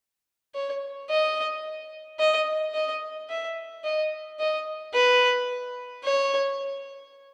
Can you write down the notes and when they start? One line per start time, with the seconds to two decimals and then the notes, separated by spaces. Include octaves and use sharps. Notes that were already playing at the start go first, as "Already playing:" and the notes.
0.55 C#5
1.10 D#5
2.19 D#5
2.74 D#5
3.29 E5
3.84 D#5
4.39 D#5
4.94 B4
6.04 C#5